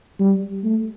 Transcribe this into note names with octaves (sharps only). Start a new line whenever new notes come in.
G3
A3